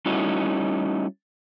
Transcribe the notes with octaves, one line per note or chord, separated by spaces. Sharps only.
G3 A3 C#4 D#4 E4 F#4